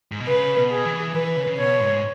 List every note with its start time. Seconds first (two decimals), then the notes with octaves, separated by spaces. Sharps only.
0.12 G#2
0.20 B2
0.27 C#3 B4
0.57 B2
0.71 G#4
0.85 E3
1.15 E3 B4
1.37 C#3
1.47 C#3
1.58 B2 C#5
1.80 G#2